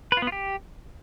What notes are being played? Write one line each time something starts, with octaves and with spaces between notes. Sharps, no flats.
B4
F4
B3
F4
G4